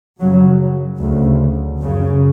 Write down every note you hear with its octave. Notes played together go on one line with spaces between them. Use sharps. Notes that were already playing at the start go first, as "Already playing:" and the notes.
F#2 C#3 F#3
D2 C#3
F#2 C#3